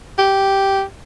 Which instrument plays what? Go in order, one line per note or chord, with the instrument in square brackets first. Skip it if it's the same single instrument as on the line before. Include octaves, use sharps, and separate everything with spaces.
[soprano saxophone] G4